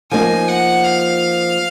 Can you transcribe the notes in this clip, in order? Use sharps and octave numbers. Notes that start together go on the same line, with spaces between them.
F3 A#3 D#4 G#5
F#5
F5